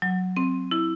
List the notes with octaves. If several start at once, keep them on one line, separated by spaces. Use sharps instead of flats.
F#3
C4
E4